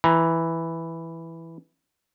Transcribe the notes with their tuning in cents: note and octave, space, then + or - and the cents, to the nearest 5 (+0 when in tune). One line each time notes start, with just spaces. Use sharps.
E3 +0 A#5 +20